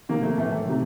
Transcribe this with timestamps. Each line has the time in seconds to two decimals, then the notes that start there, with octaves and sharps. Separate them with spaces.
0.09 C3 D#3 A#3
0.23 A3
0.38 A2 E3 A3
0.68 C3 D#3